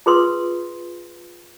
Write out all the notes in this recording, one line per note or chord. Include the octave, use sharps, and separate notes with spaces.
F4 G#4 B4 C6 D#6